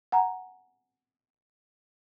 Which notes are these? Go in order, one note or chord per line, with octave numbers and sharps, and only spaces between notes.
F#5 G#5 A#5